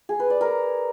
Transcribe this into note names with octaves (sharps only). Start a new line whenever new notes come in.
G#4
B4
D5
A#4